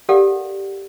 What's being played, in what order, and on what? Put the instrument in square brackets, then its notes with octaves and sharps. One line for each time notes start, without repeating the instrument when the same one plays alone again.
[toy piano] G4 A4 A#4 D5 F5 F#5